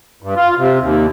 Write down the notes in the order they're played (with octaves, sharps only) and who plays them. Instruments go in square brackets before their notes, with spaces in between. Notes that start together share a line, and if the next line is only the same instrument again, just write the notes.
[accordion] G2
F4
C3
D#2